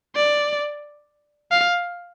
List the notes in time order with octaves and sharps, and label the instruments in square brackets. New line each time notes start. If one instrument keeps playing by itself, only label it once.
[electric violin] D5
F5